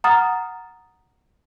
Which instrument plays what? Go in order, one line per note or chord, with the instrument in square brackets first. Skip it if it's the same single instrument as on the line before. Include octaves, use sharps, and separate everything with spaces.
[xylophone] F#5 A#5 D#6 F6 A6